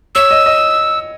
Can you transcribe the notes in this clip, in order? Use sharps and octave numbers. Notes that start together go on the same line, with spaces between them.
C#5 E6
D#5
D#5